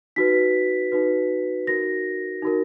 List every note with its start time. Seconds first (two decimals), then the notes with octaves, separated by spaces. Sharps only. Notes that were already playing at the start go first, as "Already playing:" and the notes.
0.16 D#4 F#4 B4 B6
0.92 D#4 F#4 B4
1.67 D#4 F#4 A#4 A#6
2.42 D#4 F#4 A#4